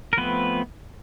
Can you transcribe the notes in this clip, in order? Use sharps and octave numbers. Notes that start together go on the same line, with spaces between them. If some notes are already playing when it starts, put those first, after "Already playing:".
A#4
F3 A3 B3 C4 B4